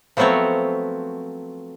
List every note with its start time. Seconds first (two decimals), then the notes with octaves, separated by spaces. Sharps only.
0.17 F3 F#3 A3 B3 C4 C#5